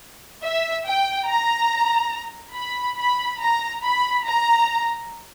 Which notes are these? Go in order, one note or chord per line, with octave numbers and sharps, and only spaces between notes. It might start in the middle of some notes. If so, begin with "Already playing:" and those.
E5
G5
A#5
B5
B5
A#5
B5
A#5